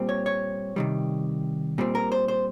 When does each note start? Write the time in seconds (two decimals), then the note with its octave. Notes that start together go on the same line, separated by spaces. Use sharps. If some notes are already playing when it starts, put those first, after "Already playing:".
Already playing: A#2 G3 C4
0.09 C#5
0.26 C#5
0.76 C3 D#3 G3
1.78 A#2 G3 C4
1.95 A#4
2.12 C5
2.28 C5